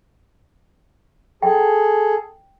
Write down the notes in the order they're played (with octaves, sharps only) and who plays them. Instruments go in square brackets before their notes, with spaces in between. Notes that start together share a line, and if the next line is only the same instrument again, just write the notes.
[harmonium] G#4 A4 [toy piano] G5